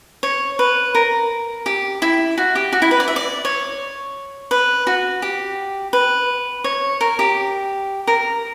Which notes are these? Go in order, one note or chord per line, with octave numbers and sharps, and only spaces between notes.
C#5
B4
A#4
G4
E4
F#4
G4
F#4
E4
B4
D5
E5
D5
C#5
B4
F#4
G4
B4
C#5
A#4
G4
A#4